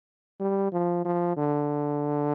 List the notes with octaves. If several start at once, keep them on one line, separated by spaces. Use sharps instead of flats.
G3
F3
F3
D3